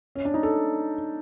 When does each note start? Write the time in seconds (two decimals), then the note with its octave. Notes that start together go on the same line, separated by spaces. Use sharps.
0.15 C#4
0.25 D4
0.34 D#4
0.43 A4